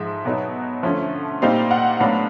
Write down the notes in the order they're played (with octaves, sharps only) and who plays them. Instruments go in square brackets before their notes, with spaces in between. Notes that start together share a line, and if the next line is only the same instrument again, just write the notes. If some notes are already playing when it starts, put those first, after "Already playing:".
Already playing: [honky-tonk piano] G#2 F3 G#3 E5
B2 F#3 B3 D#4
D3 F3 A3 C#4
A#2 G3 C4 D#4 F5
F#5
A2 F#3 B3 D4 F5